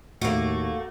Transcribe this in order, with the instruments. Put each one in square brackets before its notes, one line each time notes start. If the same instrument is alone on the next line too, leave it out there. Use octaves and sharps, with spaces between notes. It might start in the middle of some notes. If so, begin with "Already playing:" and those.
[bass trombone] D#2 [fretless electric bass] A2 [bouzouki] A3 A#3 [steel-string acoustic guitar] F#4